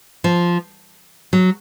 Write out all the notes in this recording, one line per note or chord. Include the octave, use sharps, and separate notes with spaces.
F3
F#3